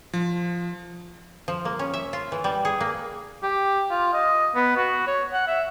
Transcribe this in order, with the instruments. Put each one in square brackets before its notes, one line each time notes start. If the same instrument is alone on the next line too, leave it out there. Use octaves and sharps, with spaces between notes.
[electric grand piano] F3
[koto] F3
A#3
C#4
E5
F4
E3
G3
G#4
A#3
[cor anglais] G4
F4
D#5
B3
F#4
C#5
F#5
E5